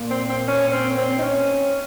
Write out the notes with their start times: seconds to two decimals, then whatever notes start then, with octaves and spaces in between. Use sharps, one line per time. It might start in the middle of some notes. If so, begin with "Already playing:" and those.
Already playing: A#2
0.10 C4
0.30 C4
0.48 C#4
0.67 C#4
0.72 C4
0.97 C4
1.18 D#4
1.22 C#4